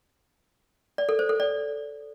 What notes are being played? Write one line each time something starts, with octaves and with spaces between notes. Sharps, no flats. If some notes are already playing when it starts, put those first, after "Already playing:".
D5
A4
C5
A4
D5